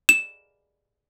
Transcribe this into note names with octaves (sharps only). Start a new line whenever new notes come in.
E7